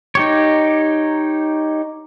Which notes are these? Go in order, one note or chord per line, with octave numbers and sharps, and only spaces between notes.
D#4 G4 C#5